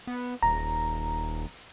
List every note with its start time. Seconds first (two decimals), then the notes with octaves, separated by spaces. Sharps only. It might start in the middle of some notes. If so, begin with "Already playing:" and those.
0.07 B3
0.42 D#1 A#5